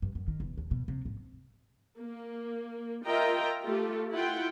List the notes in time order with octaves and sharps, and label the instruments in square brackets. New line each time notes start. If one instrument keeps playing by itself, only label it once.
[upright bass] G2
F#2
D#3
E1
D#2
B2
C3
G#1
[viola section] A#3
F4 A#4 D#5 E5 G5 A#5
A3 F4 G4 A4
E4 F4 F#5 G5